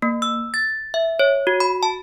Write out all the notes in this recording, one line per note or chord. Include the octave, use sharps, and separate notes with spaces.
A#3
E6
A6
E5
C#5
F#4
B5
A5